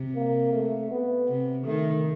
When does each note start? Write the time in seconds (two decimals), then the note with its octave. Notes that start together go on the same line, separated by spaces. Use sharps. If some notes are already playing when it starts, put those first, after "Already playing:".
Already playing: C3
0.15 A#3
0.53 A3
0.91 B3
1.29 C3
1.65 D#3 A3